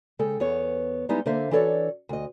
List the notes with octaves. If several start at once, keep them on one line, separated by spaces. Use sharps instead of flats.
C#3 G#3 A4 G5
E2 B3 C#5
G3 G#3 B3 D#4 E4
D3 A#3 C5 E5 F5
E3 D4 F#4 A4 C#5 D5
D2 D#5